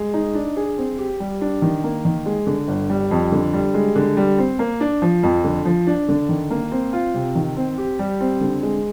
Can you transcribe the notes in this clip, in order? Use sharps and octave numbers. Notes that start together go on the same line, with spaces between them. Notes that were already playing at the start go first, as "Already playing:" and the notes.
Already playing: G#3
D#4
D4
G#4
C4
G4
G3
D4
D#3
A#3
D#3
G#3
D3
G1
G3
F2
D3
G3
G#3
D3
G3
C4
A#3
D4
F3
F2
D3
F3
D4
D3
D#3
A#3
C4
F4
C3
D#3
C4
G4
G3
C4
D3
G#3